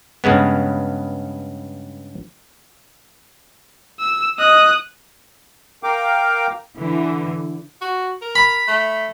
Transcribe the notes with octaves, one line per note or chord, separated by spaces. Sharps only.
G2 C#3 G#3 B3
E6
D#5 D#6 F#6
A#4 F5 G5 D6
D3 E3
F#4
A#4
B5
A3